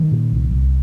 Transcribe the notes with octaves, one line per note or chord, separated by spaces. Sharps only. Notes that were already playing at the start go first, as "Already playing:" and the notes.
Already playing: D#3
A#2
C2
C2